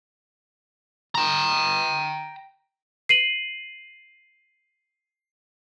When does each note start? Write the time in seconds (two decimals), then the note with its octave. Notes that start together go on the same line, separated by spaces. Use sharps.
1.15 G5 A#5
3.09 C7 D#7 F#7